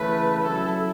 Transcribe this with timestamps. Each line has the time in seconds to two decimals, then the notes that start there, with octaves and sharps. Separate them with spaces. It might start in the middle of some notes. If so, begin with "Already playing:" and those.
Already playing: C#3 E3 A3 B4
0.43 F#3 C#4 E4 A4